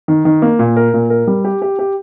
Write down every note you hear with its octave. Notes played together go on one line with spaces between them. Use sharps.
D#3
D#3
A#3
A#2
A#4
A#2
A#4
G3
G4
G4
G4